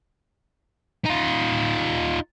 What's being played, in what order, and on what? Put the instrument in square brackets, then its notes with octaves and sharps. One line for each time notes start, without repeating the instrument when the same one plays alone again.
[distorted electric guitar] D#4 F4